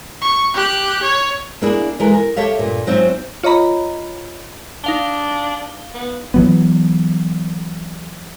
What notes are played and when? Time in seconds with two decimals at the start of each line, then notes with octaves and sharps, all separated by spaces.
0.22 C#6
0.54 G4 F#6
1.02 C#5
1.62 A#3 D4 E4 F#4 G#4
2.00 E3 G#3 F#4 A4 A#4
2.13 A#4
2.36 G4 A4 C#5 E5 F5
2.59 G2 A#2
2.87 G#2 F#3 C4 F4 E5
3.43 F4 C#5 D#5 A#5 B5
4.84 D4 D#4 F5 G7
5.94 B3
6.34 E3 F#3 B3